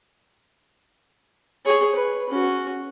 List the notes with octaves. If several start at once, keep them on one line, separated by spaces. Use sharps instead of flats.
G#4 C#5
B4
C#4 F#4